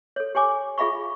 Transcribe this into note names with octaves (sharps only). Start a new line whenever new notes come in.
A4 C#5
G4 C#5 G#5 D6
F4 G#4 E5 F5 B5 C#6